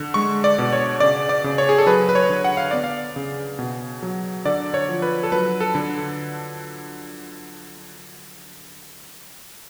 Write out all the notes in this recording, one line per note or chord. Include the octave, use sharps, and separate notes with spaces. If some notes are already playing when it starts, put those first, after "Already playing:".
Already playing: D3
G#3 C#6
D5
B2
C#5
C#3 D5
D5
C#3
C#5
G#4
A4
F#3 B4
B4
C#5
D3
F#5
F5
B3 D5
F5
C#3
B2
F#3
D3 D5
C#5
F3
B4
A4
F#3 B4
A4
D3